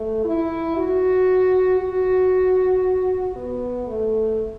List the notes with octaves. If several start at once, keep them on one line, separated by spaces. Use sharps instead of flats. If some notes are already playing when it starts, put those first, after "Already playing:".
Already playing: A3
E4
F#4
F#4
B3
A3